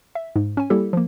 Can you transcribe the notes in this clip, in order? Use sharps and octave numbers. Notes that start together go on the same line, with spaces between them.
E5
G#2
C#4 G#5
G3 A#3 E4 G4 A4
F3 A#3